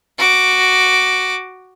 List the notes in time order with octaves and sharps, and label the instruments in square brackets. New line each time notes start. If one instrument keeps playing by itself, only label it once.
[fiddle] F#4 D6